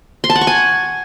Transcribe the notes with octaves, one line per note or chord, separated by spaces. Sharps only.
C6
A5
F#5
C#6
G#5